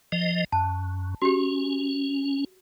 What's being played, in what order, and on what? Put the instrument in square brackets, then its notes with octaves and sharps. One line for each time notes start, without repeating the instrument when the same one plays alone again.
[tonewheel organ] F3 D#5
[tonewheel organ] F#2 [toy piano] A5
[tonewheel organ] C#4 [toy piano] F#4 G4